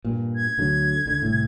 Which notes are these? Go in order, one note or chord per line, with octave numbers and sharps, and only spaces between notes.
G2 A#2
G#6
D2 D3 F#3
C#2 D3
C2 A2